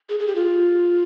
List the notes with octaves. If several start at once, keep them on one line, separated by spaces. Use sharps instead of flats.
G#4
G#4
G4
F4